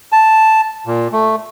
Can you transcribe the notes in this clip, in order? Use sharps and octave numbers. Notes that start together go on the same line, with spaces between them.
A5
A#2
A3